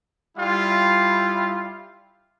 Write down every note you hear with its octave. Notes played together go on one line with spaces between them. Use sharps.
G3 E4 F4